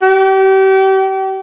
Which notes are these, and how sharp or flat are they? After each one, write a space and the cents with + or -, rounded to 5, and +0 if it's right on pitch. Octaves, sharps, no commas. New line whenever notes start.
G4 -35